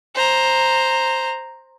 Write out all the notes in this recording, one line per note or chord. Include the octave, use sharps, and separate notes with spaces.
C5 A#5